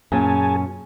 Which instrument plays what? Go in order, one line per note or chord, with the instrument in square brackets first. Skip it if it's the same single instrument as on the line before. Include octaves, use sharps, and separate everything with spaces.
[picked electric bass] F#2 [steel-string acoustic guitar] A#2 C#4 [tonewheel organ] G#4 G#5 A5